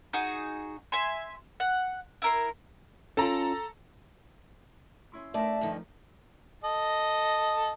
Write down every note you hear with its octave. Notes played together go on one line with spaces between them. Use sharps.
D#4 F#4 G#4
E5 G#5 C6
F#5
E4 A#4 C6
C#4 F4 A4 A#5
C#4 E4 C6
A3 D#4 A#4 D5 E5 A5
G2 D3 D#3 F3
A4 D#5